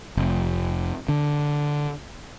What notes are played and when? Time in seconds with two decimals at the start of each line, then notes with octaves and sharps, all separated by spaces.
0.17 F1
1.09 D3